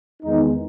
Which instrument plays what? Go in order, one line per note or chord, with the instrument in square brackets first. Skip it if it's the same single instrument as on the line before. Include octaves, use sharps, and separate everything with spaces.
[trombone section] E2 D#3 G#3 B3 D#4